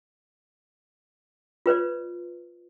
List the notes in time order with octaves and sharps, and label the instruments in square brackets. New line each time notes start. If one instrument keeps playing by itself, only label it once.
[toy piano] F4 B4 C5 D5